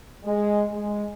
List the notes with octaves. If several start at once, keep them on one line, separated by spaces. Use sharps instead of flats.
G#3
G#3